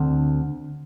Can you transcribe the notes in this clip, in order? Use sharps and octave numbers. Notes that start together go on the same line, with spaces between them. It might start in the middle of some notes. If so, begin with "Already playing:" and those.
Already playing: D2 D3 C4